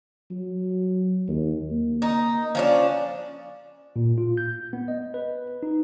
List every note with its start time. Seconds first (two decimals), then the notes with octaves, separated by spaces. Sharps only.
0.30 F#3
1.28 D#2
1.71 A#3
2.02 D#4
2.55 F3 C#4 D4
3.96 A#2
4.18 F4
4.37 G6
4.73 B3
4.88 D#5
5.14 B4
5.63 D#4